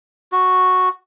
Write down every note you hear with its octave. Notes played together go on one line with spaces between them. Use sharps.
F#4